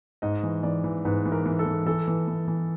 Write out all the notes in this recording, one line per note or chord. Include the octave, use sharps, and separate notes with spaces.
G#2 D#5
E3
E3 D5
E3
G#2 B4
E3
A#4
E3
A4
E3
E3 A4
E3
E3
E3